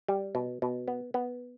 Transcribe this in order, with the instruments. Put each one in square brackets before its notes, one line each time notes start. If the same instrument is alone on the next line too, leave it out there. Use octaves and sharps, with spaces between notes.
[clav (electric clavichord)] G3
B2
B2
B3
B3